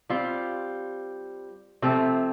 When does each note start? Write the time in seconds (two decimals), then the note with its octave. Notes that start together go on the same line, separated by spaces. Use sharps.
0.10 G3 C4 F4
1.82 C3 F3 A3 C4